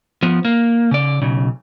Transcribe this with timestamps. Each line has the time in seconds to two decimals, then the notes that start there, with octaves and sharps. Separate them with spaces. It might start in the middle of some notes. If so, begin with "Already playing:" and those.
0.22 F3 B3
0.45 A#3
0.91 C#3 D5
1.22 B1 C#3